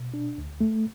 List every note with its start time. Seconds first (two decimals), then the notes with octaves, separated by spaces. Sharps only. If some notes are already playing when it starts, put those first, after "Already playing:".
Already playing: B2
0.14 D4
0.38 D2
0.61 A3